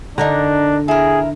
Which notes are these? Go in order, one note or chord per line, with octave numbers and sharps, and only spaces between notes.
D3 D4 D#4 A#4 A#5
E4 G#4 A#4